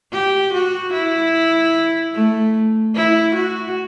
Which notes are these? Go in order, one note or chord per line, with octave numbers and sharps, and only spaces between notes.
G4
F#4
E4
A3
E4
F#4